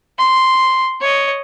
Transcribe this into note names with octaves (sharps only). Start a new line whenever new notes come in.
C6
C#5 D#5